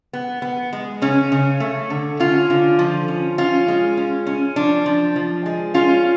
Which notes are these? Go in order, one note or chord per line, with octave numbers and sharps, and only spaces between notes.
B3
B3
G#3
C#3 C#4
C#3
A3
D3
C#4 F4
D3
F3
C#4
C#4 F4
G#3
C#4
C#4
F3 D4
F3
F3
G#3
C#4 F4